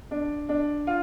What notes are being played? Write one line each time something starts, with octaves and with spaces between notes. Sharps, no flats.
D4
D4
F4